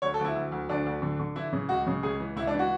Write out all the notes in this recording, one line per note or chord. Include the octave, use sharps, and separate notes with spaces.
D2 C#5
A4
D2
E4
D2
D2
D2 D4
D2
D3
D3
E3 E4
C#3
C#2 F#4
C#3
C#2 G#4
E3
C#2 E4
D4
E3
F#4